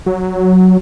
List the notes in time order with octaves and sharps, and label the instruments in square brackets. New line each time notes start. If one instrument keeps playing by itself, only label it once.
[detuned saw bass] F#3